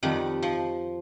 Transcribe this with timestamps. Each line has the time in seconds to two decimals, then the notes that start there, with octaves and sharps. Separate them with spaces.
0.03 F2 D#3 G3 F#5
0.42 F3